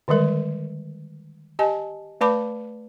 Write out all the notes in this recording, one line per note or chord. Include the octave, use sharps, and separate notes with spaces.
D3 D#3 G3 G#3 A#4
G4 D#5 G#5 A5
A3 B4 D5 A5 B5 D6